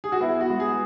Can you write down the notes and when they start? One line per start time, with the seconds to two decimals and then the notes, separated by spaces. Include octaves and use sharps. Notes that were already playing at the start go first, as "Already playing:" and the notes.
0.04 G#4
0.12 F#4
0.20 B3 E4
0.41 F#4
0.50 G#3
0.60 G#4